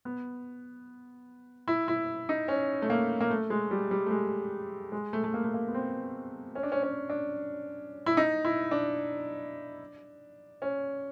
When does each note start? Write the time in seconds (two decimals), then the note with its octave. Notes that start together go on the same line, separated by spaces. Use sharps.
0.05 B3
1.68 E4
1.88 E4
2.29 D#4
2.48 C#4
2.82 A3
2.90 A#3
3.20 A#3
3.31 A3
3.50 G#3
3.71 G3
3.91 G3
4.06 A3
4.11 G#3
4.92 G#3
5.13 A3
5.24 A3
5.34 A#3
5.44 A3
5.54 A#3
5.68 B3
5.74 C4
6.55 C#4
6.63 D4
6.72 C#4
6.83 C#4
7.09 D4
8.06 E4
8.17 D#4
8.45 E4
8.71 D4
10.62 C#4